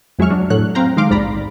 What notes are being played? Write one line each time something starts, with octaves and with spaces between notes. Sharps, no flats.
F2 F#3 G#3 E5 C#6 F6
F#3 D4
A2 F#3 C#5 F#6
C4 F5 G5 A#5
D#3 G#3 F5 C6 D6 F6
A#1 D#2 G#2 D5 A#5 B5